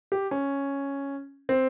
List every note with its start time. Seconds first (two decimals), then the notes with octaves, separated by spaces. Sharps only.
0.12 G4
0.31 C#4
1.49 C4